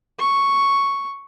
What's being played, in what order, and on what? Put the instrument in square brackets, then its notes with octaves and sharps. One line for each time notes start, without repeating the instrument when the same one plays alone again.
[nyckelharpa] C#6